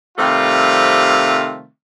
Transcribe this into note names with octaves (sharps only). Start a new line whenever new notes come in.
C3 D#3 G3 A3 C4 F4